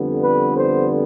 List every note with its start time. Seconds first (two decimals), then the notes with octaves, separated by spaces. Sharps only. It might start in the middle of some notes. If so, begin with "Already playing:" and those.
Already playing: F2 D3 G3 B3
0.20 B4
0.54 C5